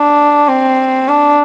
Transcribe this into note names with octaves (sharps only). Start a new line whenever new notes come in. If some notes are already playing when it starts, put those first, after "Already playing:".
Already playing: D4
C4
D4